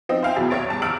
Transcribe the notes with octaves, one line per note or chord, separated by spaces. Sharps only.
F3 C4 D#4
C5 E5 F5 G5 G#5
E2 B2 F#3 E4 G#4 A6
A#1 D#2 C#5 A6 D7
E2 G2 A5
F#1 E2 E6 F6 D7 F#7